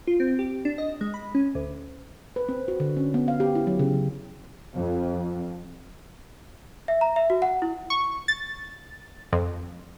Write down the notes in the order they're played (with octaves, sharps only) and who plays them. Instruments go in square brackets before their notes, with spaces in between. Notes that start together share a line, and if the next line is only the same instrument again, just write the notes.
[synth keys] F4
C4
G4
D4
D#5
G#3
B5
C#4
D2
[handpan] B4
C4
F#4
D3
C#4
B3
F5
G4
E4
F#3
C#3
F#3
[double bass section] F2
[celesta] E5
A#5
E5
F#4
F#5
E4
[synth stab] C#6
A6
F2